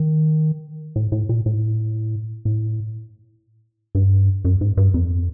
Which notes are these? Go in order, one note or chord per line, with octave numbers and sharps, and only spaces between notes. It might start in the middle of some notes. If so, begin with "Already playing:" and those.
Already playing: D#3
A2
A2
A#2
A2
A2
G2
F#2
G#2
G2
F2